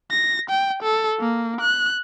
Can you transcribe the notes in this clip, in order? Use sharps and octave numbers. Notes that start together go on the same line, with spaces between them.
A#6
G5
A4
A#3
F#6